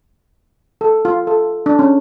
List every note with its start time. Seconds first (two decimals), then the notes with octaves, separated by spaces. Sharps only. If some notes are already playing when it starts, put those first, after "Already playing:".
0.81 A4
1.05 F4
1.27 A4
1.66 D4
1.79 C#4